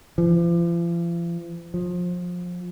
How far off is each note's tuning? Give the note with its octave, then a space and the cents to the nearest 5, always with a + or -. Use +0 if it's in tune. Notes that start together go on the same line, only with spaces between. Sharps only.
F3 -45
F3 +25